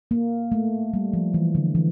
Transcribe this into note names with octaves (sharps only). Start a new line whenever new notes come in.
A#3
A3
G3
F3
E3
D3
E3